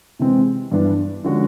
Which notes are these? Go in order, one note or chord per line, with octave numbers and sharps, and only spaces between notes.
C3 E3 G#3 C4
G2 E3 G3 B3 D4
D3 F3 G#3 C#4 F#4